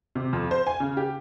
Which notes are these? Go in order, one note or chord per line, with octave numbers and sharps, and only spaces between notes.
C3
F2
C5
G#5
C#3
G4